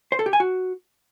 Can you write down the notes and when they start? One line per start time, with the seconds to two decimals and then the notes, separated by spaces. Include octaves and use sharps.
0.12 C5
0.19 A4
0.26 G4
0.33 G#5
0.40 F#4